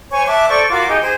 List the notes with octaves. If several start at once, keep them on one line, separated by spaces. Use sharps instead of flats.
C5 C#5 G#5 C#6
E5 A5 D6 F#6
A4 C5 D5 C#6
F4 F#4 A#4 D6
D#4 G4 G#4
G#4 C5